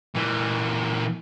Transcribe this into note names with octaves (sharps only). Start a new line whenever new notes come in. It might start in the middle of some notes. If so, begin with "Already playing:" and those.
A#2 E3